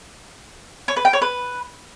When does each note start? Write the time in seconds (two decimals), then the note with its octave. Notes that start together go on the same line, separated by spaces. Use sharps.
0.88 C#5
0.96 B4
1.05 G5
1.13 C#5
1.22 B4